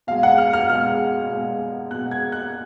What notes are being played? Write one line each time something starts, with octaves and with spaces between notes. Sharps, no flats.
B2 G#3 F5
F#5
F6
F6
B2 G#3 F6
B2 G#3
B2 G#3 F#6
G#6
F#6